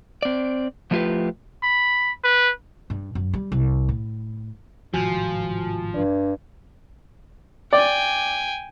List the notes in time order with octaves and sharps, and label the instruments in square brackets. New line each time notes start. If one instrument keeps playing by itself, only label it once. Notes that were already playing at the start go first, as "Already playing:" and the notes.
[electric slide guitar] C4 D5
F3 A3 E4 F4 G4 B4
[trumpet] B5
B4
[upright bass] G2
F#2
G3
C2
A2
[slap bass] G#1 A2 C3 [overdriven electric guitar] F3 [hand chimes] F#4 G#5
[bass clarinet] G2 [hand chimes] D5
[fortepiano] D5 [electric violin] G5 G#5